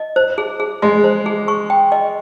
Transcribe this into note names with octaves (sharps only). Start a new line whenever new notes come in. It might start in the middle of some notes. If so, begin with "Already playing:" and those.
Already playing: D#5
C5
G#4
G#4
G#3 D#5
C5
G#4
C#6
G5
D#5